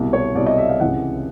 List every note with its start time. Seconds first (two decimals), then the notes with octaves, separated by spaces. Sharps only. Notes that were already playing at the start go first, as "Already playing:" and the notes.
Already playing: C2 B2
0.13 C#5
0.35 C2 B2 D5
0.46 D#5
0.58 E5
0.69 F5
0.80 C#2 C3 E3 F#5